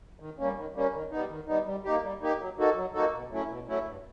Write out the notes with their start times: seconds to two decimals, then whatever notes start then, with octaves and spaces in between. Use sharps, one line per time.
0.20 D#3
0.38 G3 A#3 C#4
0.56 D#3
0.75 G3 A#3 C#4
0.93 D#3
1.11 G3 B3 D#4
1.30 D#3
1.48 G3 B3 D#4
1.66 G3
1.84 A#3 D#4 G4
2.03 G3
2.21 A#3 D#4 G4
2.39 F#3
2.58 A#3 D#4 F#4 A4
2.76 F#3
2.94 A#3 D#4 F#4 A4
3.13 B2
3.31 F#3 A3 C#4 E4
3.50 B2
3.68 F#3 A3 C#4 E4
3.86 G2